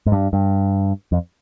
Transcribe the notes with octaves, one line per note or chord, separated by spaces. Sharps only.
G#2
G2
G2
F2